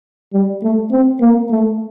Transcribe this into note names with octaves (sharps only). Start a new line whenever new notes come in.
G3
A3
C4
A#3
A3